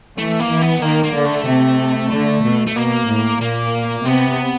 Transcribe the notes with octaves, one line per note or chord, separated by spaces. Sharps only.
E3 A3
A#3
E3
B3
D#3 A#3
A#3
D3
A3
C3
D3
B2
A3
B2 A#3
A2
A#2 A#3
C3 B3